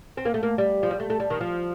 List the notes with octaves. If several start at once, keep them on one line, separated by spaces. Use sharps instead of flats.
C4
A#3
A3
A#3
G3
F3
G3
A3
A3
G3
D#3
F3